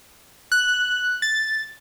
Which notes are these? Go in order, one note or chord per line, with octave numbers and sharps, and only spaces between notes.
F#6
A6